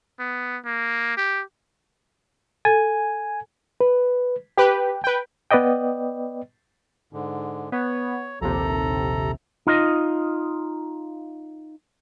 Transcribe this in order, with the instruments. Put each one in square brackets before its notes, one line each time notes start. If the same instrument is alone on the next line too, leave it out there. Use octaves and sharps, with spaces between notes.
[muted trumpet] B3
A#3
G4
[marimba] A4 [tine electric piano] G#5
[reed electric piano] B4
[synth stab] G4 B4 [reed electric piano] G5
[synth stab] B4 G5
[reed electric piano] B3 B4 D5 D#5 G5
[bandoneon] G#2 D3
[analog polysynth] B3 [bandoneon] C#5
[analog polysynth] A#1 D#2 C3 [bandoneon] A4 A#5
[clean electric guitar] D#4 F4 D#5